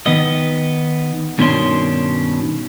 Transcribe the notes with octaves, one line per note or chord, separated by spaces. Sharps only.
D#3 B3 D#5
G2 B2 D#3 C#4 D4 C6